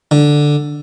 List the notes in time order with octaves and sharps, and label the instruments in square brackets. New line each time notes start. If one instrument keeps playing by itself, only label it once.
[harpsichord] D3